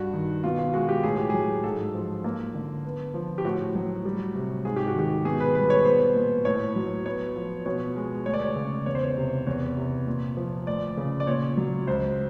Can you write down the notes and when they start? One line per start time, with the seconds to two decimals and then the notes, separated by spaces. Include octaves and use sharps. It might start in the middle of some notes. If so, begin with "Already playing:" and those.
Already playing: G2 F#4
0.14 D#3
0.44 B2 F4
0.59 F4
0.73 G#3 F#4
0.89 G4
1.04 A2 G#4
1.17 G4
1.30 F#3 G#4
1.64 G#2 A4
1.94 F3
2.24 A#3
2.54 D3
2.84 B3
3.14 F3
3.38 G4
3.45 A2 F#4
3.75 F#3
4.05 G3
4.35 C3
4.65 G#2 G#4
4.76 G4
4.87 F#4
4.95 D#3 G4
5.25 B2 G#4
5.40 B4
5.55 G3 B4
5.70 C#5
5.85 B3 C5
6.15 A#2
6.45 A2 C#5
6.76 F#3
7.06 B3 C#5
7.36 F3
7.66 B2 C#5
7.96 G#3
8.26 D2 C#5
8.34 D5
8.41 C#5
8.56 C#3
8.86 E2 C#5
8.95 C5
9.03 C#5
9.17 C3
9.47 E2 C#5
9.76 C3
10.07 A#2
10.37 F3
10.67 D2 D5
10.97 C#3
11.20 D5
11.27 A#2 C#5
11.57 F#3
11.87 C#2 C5